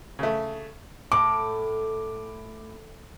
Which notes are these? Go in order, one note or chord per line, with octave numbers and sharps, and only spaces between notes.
C#3 A3
A2 D6